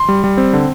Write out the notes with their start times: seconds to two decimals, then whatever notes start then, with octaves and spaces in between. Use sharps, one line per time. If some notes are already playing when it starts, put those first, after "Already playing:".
Already playing: C6
0.09 G3
0.24 G3
0.38 C4
0.53 D3